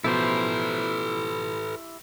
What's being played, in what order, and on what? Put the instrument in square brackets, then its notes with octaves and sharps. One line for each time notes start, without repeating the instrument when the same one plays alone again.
[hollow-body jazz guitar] B2 F3 [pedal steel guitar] E4 G4 C5 [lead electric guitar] A4 B4